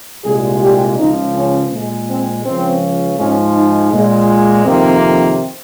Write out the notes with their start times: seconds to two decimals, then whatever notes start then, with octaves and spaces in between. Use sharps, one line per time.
0.24 C2 A#2 G#3 G#4
0.61 G4
0.98 C#2 C#3 F3 D#4
1.35 C#4
1.71 A#2 G#3
2.08 C4
2.45 C#2 C#3 F3 C4
3.18 G#2 F3 G#3 C#4
3.55 D#4
3.92 A#2 G#3
4.65 F2 C3 D#3 A#3 C4